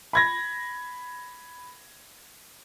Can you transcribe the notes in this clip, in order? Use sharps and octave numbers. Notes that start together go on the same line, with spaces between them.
B5 G#6 A#6